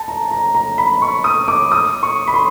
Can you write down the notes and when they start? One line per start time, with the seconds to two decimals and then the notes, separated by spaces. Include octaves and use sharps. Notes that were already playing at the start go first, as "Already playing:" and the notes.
Already playing: A5
0.08 A#5
0.31 A#5
0.55 A#5
0.78 B5
1.02 C#6
1.24 D#6
1.48 D6
1.72 D#6
2.03 C#6
2.27 B5
2.34 C6